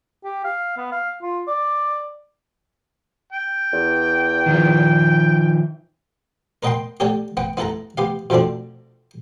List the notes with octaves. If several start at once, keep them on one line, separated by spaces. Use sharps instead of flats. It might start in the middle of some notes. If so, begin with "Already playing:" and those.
G4
F5
B3
F5
F4
D5
G5
E2
D#3 F3
A#4 B4 D#5 F#5 G5 C6
G4 A4 C#5 D5 F#5
B3 F#5 G5
B3 E4 A4 F#5 A#5
B3 G4 F5
B2 F3 A3 C4 D4